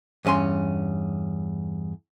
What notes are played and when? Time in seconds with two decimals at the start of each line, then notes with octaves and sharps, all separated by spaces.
0.25 E2 G2 C#4 G#5 C6